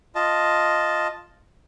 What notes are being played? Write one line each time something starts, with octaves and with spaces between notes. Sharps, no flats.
F4 D#5 A5